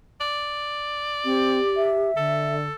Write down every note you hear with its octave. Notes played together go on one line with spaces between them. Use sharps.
D5
C4 G4
E5
D3 A4